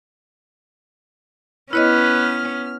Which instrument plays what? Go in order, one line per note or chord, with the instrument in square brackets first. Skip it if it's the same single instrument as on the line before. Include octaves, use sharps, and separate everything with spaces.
[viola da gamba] B3 C#4 [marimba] E4 C#5 D#5 [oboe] B4 [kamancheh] F6